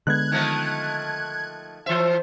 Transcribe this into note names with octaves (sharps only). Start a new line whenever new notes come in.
D3 G#3 B3 F#6 G#6
D#3 F3 A3
E3 C5 E5